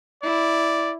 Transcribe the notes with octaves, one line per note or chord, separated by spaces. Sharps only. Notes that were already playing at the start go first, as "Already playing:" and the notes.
E4 D5